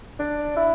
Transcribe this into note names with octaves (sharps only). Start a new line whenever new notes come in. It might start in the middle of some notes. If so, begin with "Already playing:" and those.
D4
E4